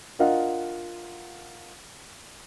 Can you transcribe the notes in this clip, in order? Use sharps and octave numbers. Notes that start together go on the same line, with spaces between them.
D4 F4 A#4 D#5 F5 F#5